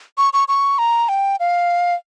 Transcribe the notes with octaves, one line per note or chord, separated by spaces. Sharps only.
C#6
C#6
C#6
A#5
G5
F5